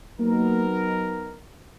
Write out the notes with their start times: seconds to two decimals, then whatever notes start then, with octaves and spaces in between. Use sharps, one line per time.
0.19 F#3 A#3 B3 D#4 A#4